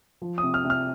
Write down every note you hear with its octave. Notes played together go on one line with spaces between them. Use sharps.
F3
D#6
C3
F6
C3
F6